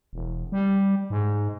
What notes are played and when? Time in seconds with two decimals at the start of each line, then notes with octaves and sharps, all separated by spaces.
0.13 E1
0.52 G3
1.10 G#2